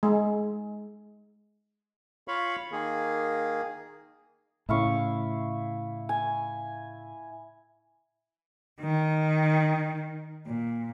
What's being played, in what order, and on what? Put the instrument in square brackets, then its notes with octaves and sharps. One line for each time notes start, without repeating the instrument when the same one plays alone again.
[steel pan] G#3
[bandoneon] F4 C#5 F5 B5 C#6
D#3 A#3 G#4
[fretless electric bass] A2 C#3 C#4 [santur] E4 F5 C#6
[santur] G#5
[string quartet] D#3
A#2